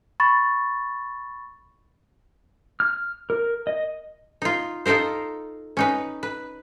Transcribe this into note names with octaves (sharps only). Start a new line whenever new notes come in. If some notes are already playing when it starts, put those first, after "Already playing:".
B5 C#6 A6
F6
A#4
D#5
D#4 F4
D#4 F4 A4 A#4 C5
C#4 D#4 B4
B4